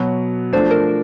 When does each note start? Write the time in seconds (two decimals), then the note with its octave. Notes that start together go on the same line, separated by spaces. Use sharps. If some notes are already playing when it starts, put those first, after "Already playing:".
Already playing: B2 F#3 B3 C#5
0.53 F3 A3 D4 C5
0.71 A#4